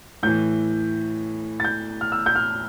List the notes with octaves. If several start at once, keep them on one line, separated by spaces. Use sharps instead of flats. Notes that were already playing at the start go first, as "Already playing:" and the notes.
A2 E3 G6
A6
G6
F6
E6
G6
F6